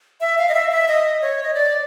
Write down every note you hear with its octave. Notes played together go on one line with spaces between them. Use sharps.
E5
F5
D#5
E5
E5
D#5
C#5
D#5
D5